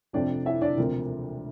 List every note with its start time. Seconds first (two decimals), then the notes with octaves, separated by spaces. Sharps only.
0.13 F1 F2 C3 F3 C4 D4 D5
0.46 E4 E5
0.62 D4 D5
0.77 E1 D2 C3 F3 C4 A#4